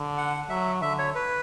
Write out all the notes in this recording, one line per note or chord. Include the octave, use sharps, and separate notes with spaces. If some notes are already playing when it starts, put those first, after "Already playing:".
Already playing: D3
F#5
F#3 E5
D3 E5
C#5
B4